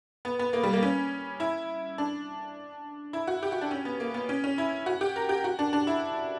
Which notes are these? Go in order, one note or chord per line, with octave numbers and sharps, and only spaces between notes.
B3
B3
A#3
G3
A#3
C#4
E4
D4
E4
F#4
G4
F#4
D4
C#4
B3
A#3
B3
C#4
C#4
E4
F#4
G4
A#4
G4
F#4
D4
D4
E4